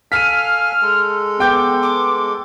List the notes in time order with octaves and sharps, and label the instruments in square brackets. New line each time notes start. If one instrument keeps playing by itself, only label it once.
[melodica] A4 F5 G#5 [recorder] F6 [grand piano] B6 D#7
[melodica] G#3 A4
[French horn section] B3 [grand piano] G5 G6 [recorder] D6
[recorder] D6